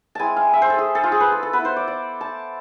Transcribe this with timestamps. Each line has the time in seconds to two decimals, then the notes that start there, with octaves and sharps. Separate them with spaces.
0.15 G#3 C4 E4 G#5 A5
0.36 F5
0.54 E5
0.62 C5
0.70 A4
0.79 G#4
0.95 A4
1.04 F4
1.12 G#4
1.20 B4
1.32 A4
1.43 A4
1.53 B3 E4 B4
1.65 C5
1.76 D5
1.88 D5
2.21 A5